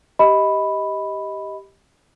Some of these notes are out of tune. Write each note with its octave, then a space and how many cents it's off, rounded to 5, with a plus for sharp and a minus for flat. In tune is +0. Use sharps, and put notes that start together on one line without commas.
G4 +0 D#5 +20 B5 +0